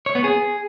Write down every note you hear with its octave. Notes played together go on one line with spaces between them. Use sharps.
C#5
B3
G#4